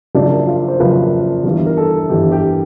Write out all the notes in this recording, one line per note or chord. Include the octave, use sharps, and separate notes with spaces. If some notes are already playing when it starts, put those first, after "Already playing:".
F#1 F#2 C#3 F3 D4
F4
C5
F#1 F#2 C#3 F3 B4
G1 G2 E3
A#4
A4
G1 G2 E3 G4
G4